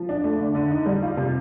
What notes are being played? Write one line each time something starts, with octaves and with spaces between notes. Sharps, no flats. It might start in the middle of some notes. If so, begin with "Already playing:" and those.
Already playing: F3
D4
A3
D3
D3
D#4
G3
F4
C3